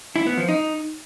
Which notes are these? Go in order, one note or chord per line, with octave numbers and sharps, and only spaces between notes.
E4
B3
F3
D#4